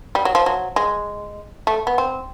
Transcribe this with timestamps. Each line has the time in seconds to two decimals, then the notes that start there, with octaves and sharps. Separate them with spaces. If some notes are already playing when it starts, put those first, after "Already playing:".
0.15 G3
0.25 F#3
0.35 F3
0.46 F#3
0.76 G#3
1.67 A3
1.87 B3
1.98 C4